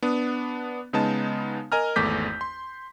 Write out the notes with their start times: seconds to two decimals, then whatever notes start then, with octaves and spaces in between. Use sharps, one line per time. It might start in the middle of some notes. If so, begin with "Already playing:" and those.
0.02 B3 D4 D#6
0.93 C#3 G#3 B3 D#4 A5
1.72 A#4 D#5 G#5 A#5 F6
1.96 G#1 E2 A3 D6 G6 B6
2.41 C6